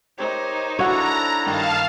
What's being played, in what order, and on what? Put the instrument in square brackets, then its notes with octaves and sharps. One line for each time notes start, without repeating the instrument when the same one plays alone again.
[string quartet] D#4 A#4 C5 [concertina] G4 C#5
[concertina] D4 E4 A4 [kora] F#4 C#5 [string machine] A#5
[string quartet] G2 D#3 G3 [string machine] F5 A5 F6